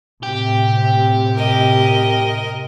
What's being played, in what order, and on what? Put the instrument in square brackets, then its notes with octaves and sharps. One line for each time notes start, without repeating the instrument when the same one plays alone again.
[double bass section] A2 C3 [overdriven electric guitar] G4
[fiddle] A#4 D#5